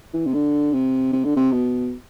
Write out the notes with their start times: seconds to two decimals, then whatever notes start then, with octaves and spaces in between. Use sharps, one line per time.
0.14 E3
0.26 C3
0.34 D3
0.73 C3
1.13 C3
1.25 D3
1.36 C3
1.52 B2